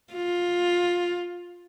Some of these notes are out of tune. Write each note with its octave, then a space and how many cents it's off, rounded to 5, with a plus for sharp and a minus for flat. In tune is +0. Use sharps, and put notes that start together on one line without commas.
F4 +10